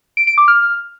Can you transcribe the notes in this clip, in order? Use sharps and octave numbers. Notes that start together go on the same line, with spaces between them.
D7
D7
D6
F6